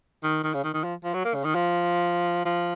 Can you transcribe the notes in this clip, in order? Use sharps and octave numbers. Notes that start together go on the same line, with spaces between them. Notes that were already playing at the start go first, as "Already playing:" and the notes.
D#3
D#3
C#3
D#3
D#3
F3
F3
F#3
A#3
C#3
D#3
F3
F3